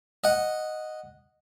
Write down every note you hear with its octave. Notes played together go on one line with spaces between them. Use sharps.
D#5 F#5